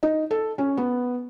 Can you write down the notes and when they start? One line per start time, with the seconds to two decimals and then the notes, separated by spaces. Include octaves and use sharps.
0.03 D#4
0.31 A4
0.58 C#4
0.77 B3